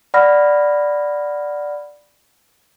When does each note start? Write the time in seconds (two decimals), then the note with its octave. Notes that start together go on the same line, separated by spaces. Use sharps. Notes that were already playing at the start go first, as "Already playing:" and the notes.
0.14 D5 F#5 B5 F6 A#6